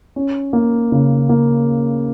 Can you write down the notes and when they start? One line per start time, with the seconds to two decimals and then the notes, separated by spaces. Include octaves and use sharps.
0.16 C#4
0.53 A#3
0.92 C#3
1.29 A#3